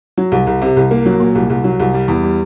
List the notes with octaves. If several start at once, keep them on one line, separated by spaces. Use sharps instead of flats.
F#3
C2
C2
C3
C2
A#3
F#3
A#2
C2
C2
F#3
C2
G3
E2
G3